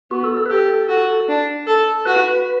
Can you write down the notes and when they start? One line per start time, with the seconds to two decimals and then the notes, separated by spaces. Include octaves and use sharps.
0.11 B3 F#4
0.24 A4
0.37 A4
0.46 B4
0.50 G4 A4
0.88 F#4
1.28 D4
1.67 A4
2.05 F#4 B4